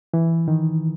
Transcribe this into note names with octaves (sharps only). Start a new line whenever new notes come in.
E3
D#3